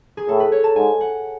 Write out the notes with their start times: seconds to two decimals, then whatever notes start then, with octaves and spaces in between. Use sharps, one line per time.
0.17 G#4
0.28 A2 A4
0.40 B4
0.52 C#5
0.64 A5
0.76 G#2 G#5
1.01 F#5